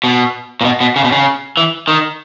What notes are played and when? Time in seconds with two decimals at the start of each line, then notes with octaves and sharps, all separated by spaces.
0.04 B2
0.61 A#2
0.65 B2
0.81 B2
0.96 C#3
1.04 B2
1.12 C#3
1.57 E3
1.88 D#3